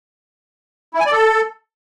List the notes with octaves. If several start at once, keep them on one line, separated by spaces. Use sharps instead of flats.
E4
G#5
D5
A4